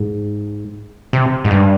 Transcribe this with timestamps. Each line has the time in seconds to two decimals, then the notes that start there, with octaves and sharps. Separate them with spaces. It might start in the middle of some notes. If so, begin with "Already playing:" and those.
Already playing: G#2
1.13 C3
1.44 G#2
1.50 G2